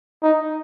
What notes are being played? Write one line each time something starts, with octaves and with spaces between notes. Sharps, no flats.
D#4